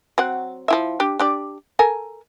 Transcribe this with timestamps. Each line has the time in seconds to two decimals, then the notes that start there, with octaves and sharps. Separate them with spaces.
0.18 F#3 C4 F#5
0.68 F3 E4 E5
1.00 D4 G4
1.19 D4 G4 D5
1.79 A4 A#4 G#5